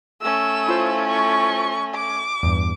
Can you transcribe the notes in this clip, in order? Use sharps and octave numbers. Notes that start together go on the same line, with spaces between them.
A3 C#4 E6
E4 F4 C5
C#6
D6
E2 G2